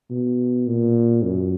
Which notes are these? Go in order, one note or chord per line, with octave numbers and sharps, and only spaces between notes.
B2
A#2
F#2